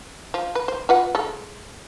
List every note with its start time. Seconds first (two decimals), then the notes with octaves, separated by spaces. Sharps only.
0.34 F3
0.55 B4
0.68 C5
0.89 F4 B4 F#5
1.15 G#3 A4